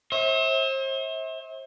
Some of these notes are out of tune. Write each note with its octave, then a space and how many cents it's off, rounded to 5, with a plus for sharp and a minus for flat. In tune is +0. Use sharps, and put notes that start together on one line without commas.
C5 +40 E5 -35